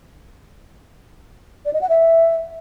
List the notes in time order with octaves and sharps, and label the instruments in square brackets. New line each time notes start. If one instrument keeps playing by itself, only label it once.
[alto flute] D5
D#5
F#5
E5